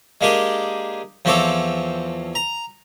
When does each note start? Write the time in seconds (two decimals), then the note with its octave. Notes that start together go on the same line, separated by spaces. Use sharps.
0.21 G#3 A#3 D4 G4 G#4
1.25 E2 F3 C4 A4 C#5 D6
2.35 A#5